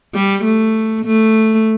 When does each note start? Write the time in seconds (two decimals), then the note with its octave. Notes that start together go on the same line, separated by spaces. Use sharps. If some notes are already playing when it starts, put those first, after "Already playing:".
0.14 G3
0.44 A3
1.05 A3